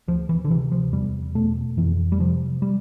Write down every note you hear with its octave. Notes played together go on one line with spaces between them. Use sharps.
D2 F3
E3
D3
C3 E3
F3
E2 G3
B2 A3
F2 E3
G3
C3 F3
G3